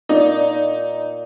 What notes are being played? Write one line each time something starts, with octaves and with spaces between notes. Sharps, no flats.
A#2 D#4